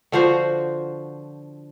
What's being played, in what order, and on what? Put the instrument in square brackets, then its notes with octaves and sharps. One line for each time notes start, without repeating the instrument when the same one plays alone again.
[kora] D3 F3 F#4 C5